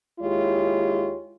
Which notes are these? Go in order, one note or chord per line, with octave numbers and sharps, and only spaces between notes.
D#2 G#3 E4 F4 G4 C#5